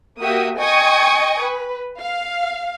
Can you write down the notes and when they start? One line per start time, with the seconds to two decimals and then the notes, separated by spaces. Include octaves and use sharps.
0.20 A#3 F#4 G4 E5 D#6
0.59 D#5 G5 G#5 C#6 D#6 G#6
1.41 B4
1.99 F5